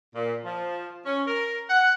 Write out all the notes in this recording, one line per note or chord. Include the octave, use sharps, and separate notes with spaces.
A#2
F3
C#4
A#4
F#5